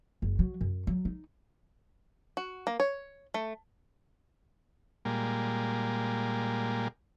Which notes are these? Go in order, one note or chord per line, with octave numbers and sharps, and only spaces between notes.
F#1
F#3
F#2
F#3
D#4
F#4
A#3
C#5
A3
A#2 G3 G#3 A#3